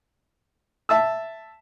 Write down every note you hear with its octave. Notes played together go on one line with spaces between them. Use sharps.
E5 A5 E6